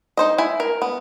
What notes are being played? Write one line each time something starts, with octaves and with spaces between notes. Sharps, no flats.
D#4 C5 D#5
E4 G#5
A#4
B3